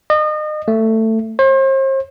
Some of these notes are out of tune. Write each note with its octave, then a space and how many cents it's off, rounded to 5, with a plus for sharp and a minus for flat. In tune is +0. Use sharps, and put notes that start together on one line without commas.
D#5 -35
A3 +15
C5 +40